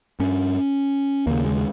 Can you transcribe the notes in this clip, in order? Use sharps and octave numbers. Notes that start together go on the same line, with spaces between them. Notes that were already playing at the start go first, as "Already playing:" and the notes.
G2 C#4
D#2 C#3 A#3
G#3